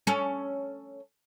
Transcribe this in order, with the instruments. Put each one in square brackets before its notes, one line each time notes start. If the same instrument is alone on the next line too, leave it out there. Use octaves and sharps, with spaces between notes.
[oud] C#4 A4